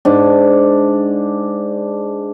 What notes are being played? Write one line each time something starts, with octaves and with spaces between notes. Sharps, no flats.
G#2 D4